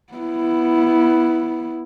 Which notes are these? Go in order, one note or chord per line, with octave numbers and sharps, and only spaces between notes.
B3 E4